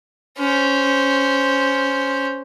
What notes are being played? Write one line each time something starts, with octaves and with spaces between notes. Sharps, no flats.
C#4 C5